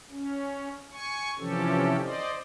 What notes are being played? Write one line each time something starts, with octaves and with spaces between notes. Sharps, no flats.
C#4
G#5 C#6
C3 E3 F3 C#4 G4 A4
C5 D5 D#5